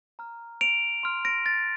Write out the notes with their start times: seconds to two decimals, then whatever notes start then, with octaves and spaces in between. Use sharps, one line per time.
0.19 A#5 F6
0.61 D7 F7
1.03 C6 F6
1.25 A#6 D7
1.46 A6